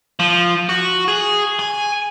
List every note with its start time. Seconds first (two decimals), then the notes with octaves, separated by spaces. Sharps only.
0.19 F3
0.69 F#4
1.08 G#4
1.59 G#5